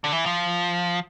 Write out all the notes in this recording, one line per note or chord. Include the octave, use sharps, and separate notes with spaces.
D3
E3
F3